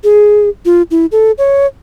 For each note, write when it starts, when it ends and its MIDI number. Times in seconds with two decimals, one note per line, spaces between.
0.04 0.49 68
0.65 0.82 65
0.91 1.06 64
1.12 1.31 69
1.38 1.66 73